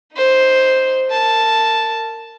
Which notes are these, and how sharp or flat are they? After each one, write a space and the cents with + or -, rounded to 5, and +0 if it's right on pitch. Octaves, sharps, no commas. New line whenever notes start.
D#4 +0 C5 +0
A#4 -20 A5 +0